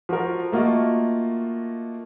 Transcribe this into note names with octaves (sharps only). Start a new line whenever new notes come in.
F3 F#4 A4 A#4
A3 A#3 F4 F#4 D#5